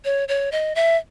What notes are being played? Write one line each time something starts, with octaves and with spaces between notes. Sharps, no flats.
C#5
C#5
D#5
E5